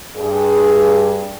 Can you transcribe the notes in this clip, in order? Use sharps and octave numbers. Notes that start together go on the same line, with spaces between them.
G2 G#4